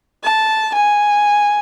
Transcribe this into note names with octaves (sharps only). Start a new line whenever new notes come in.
A5
G#5